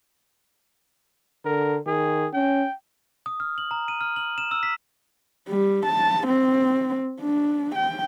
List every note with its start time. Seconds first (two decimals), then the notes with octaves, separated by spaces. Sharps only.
1.45 D3 A#4
1.87 D#3 G#4
2.33 C#4 G5
3.26 D#6
3.40 F6
3.58 F#7
3.71 A#5
3.88 D#7
4.01 F6
4.16 F#7
4.38 E7
4.51 E6
4.63 B6
5.48 G3
5.86 A5
6.28 C4
7.20 D4
7.75 G5